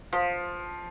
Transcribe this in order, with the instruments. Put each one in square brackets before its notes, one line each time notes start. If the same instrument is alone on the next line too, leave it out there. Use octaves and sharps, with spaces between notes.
[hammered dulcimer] F3